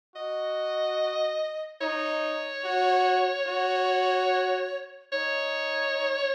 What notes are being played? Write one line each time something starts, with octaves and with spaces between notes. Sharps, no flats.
F#4 D#5
D#4 C#5
F#4
F#4
D#4 C#5